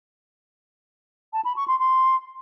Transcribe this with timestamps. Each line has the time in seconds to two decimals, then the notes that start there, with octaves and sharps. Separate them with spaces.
1.33 A5
1.45 B5
1.56 C#6
1.68 C6
1.79 C6